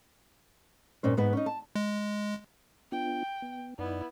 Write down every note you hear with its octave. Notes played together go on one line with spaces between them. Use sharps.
G2 A#2 C#4 C5
G#2 B3 B4
C#4 D#4
A5
G#3
B3 D4 F4 G5
B3
F#2 B3 D#4 E4 D5